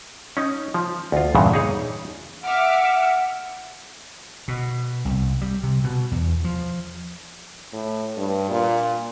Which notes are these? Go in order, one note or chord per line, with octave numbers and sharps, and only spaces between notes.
C#4 D#4
F3
D2 F4
E2 G2 A#2 C#3 E3
D#4 G#4 C#5
E5 F#5 D6 F6
B2
C2
G3
C3
B2
E2
F3
A2
G2
A#2